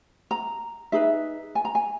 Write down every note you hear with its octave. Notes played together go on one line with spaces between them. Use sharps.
A#5
D#4 G#4 B4 E5
G#5
A#5
G#5